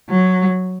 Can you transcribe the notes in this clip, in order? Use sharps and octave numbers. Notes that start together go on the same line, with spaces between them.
F#3